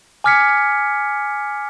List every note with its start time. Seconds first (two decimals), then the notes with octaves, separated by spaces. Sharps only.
0.24 G#5 D6 F6 G#6 B6 C#7